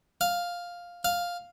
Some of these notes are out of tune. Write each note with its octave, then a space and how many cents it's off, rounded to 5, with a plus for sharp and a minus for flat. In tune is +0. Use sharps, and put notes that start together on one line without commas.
F5 +5
F5 +5